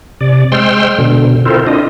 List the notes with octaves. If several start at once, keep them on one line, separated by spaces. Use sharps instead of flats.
C3 D5
G#3 C5 G5 C6 E6 F6
B2 D3
C4 E4 F4 A4 A#4 C5
D4 E4 F4 D#5